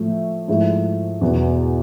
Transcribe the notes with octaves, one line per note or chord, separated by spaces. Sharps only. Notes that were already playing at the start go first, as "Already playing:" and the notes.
Already playing: A2 F3 A3
G#2 F3 A3 E4
E2 B2 B3